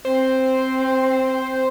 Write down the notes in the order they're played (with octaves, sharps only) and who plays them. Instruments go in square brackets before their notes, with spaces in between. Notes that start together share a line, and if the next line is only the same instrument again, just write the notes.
[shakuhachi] C4 [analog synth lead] C5